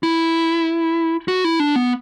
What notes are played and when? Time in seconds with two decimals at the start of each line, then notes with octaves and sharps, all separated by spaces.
0.03 E4
1.28 F#4
1.44 E4
1.60 D4
1.76 B3